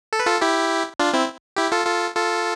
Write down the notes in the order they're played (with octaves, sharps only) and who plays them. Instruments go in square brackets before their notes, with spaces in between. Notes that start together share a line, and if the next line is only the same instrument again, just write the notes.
[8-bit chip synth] A4
B4
F4 A4
E4 G4
D4 F4
C4 E4
E4 G4
F4 A4
F4 A4
F4 A4